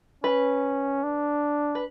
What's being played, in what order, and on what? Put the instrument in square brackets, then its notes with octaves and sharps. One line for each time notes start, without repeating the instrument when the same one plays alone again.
[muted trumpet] C#4 [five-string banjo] B4
[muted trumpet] D4
[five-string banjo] B4